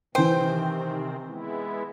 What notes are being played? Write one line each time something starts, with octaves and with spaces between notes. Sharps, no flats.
C3 D#3 E3 C4 C5 G5
G#3 B3 E4